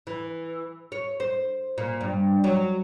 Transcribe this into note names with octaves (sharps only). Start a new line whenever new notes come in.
E3
C#5
C5
A#2
G2
F#3